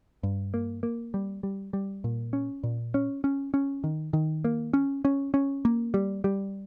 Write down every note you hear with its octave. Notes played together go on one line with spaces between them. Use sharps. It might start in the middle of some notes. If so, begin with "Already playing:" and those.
G2
A#3
A#3
G3
G3
G3
A#2
C#4
A#2
C#4
C#4
C#4
D#3
D#3
A#3
C#4
C#4
C#4
A#3
G3
G3